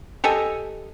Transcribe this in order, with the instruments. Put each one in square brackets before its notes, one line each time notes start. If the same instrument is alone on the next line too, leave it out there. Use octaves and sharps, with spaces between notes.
[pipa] G4 A4 D#5 G#5